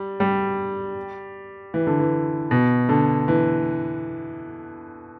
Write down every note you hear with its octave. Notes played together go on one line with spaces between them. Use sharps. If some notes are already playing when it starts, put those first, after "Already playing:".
Already playing: G3
G3
E3
D3
E3
B2
D3
E3